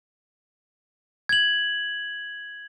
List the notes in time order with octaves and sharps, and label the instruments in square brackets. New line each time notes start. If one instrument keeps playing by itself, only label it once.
[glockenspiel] G#6 F#7